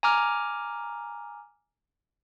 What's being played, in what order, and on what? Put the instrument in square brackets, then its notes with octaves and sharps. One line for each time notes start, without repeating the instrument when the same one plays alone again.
[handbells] G#5 A#5 D6 F6